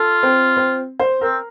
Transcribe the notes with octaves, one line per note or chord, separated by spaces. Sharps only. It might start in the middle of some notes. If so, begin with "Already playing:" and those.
Already playing: F4 A4
C4
C4
C5
C4 A#4